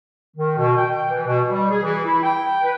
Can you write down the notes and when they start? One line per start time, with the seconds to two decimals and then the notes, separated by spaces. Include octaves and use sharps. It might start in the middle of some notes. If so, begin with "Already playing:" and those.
0.36 D#3
0.56 B2
0.76 G5
1.08 E3
1.26 B2
1.48 G3
1.69 G#4
1.82 E3
2.03 E4
2.23 G5
2.62 B4